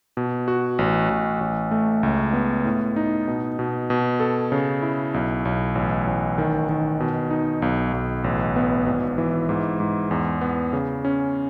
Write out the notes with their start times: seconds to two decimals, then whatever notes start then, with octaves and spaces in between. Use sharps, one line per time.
0.17 B2
0.48 F#4
0.79 A1
1.10 A1
1.41 A1
1.71 A3
2.03 C#2
2.33 B3
2.65 A2
2.96 D#4
3.28 B2
3.59 B2
3.90 B2
4.20 A4
4.52 C#3
4.82 E4
5.14 B1
5.45 B1
5.75 A1
6.07 A1
6.38 D#3
6.69 D#3
7.00 B2
7.31 D#4
7.62 B1
7.93 B1
8.24 A1
8.56 B3
8.86 G#1
9.18 E3
9.49 G#2
9.80 G#2
10.11 E2
10.41 B3
10.73 C#3
11.05 C#4